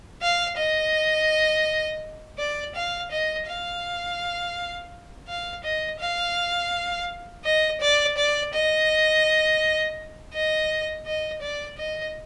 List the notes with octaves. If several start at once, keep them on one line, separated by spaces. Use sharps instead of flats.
F5
D#5
D5
F5
D#5
F5
F5
D#5
F5
D#5
D5
D5
D#5
D#5
D#5
D5
D#5